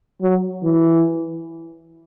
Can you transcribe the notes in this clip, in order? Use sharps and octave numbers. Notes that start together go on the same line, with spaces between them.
F#3
E3